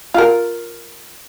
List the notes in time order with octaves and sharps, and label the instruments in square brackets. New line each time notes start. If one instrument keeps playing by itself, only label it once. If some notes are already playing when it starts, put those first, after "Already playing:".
[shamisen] F4 A#4